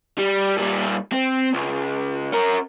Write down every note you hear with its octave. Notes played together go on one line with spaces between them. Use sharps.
G3
A#2 G3
C4
C#2
C#4 A#4